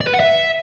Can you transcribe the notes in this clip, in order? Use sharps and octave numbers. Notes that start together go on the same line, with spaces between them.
D5
B4
F#5
E5